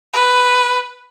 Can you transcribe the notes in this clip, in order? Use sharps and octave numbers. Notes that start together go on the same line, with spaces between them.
B4